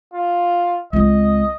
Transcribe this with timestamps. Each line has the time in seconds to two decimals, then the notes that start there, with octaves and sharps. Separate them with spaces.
0.14 F4
0.93 C#2 C4 D#5